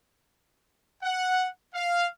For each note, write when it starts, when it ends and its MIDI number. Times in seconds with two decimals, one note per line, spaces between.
1.03 1.47 78
1.74 2.07 77